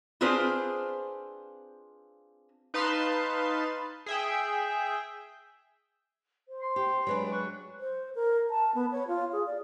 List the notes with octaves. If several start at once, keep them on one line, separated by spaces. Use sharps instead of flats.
C4 D4 F4 G#4 B4 C5
D#4 B4 F5 A5 C6
G#4 E5 G5
C5
C6
G4
F#3 G#3 D4 B4
C#6 F#6
C5
A#4
A5
B3
C#5
F4
G#4
D5